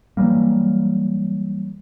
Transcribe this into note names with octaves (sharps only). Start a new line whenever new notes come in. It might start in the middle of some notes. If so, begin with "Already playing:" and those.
E3 F#3 G3 A#3